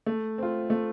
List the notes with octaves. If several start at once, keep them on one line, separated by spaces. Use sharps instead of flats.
A3
C4 F4
A3